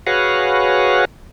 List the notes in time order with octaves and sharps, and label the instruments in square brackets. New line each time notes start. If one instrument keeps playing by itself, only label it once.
[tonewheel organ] F#4 G#4 B4 C#5 F5 F#5